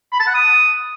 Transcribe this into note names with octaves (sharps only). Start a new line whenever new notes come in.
B5
A5
F#5
D#6